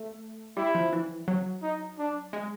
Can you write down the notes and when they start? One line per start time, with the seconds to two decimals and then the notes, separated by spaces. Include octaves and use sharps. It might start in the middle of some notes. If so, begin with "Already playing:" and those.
Already playing: A3
0.57 G3 E4
0.75 F3
0.93 E3
1.28 F#3
1.62 D#4
1.99 D4
2.33 G#3